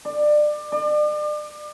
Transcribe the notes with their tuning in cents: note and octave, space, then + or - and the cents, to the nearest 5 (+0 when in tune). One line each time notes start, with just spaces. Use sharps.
D5 +25
D5 +35